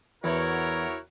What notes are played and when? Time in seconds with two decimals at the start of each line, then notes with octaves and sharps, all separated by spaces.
0.24 E2 E4 F#4 A#4 C#5